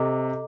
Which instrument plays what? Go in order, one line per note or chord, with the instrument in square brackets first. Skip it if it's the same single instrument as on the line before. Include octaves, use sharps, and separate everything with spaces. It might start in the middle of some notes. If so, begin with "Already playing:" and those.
Already playing: [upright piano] C3 [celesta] A4 D#5 A#5 D6